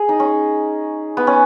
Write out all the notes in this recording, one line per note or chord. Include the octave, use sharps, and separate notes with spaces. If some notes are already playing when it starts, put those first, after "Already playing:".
Already playing: G#4
D#4
C#4
B3
C#4